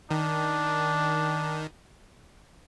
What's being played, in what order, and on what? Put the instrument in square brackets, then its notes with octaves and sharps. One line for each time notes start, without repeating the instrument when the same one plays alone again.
[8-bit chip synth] D#3 [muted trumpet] D4